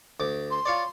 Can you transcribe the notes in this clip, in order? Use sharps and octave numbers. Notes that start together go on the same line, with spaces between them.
D2 D6
C6
F4 C#5 D5